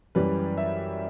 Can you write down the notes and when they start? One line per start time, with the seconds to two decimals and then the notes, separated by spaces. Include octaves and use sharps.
0.15 F#2 E3 G3 B4
0.58 E5